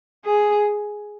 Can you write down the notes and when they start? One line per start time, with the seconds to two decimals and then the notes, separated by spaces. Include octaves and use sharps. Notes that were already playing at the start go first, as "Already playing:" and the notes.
0.25 G#4